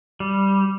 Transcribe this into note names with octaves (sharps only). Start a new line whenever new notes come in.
G3